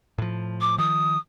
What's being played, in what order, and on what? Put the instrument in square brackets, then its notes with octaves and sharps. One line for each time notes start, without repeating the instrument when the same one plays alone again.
[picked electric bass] A2 F3
[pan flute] D6
[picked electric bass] D#3 F3 [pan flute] D#6